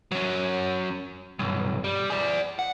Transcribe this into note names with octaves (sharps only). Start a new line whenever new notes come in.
F#3 C#4
B1 G2
G3
G#4 D5
F#5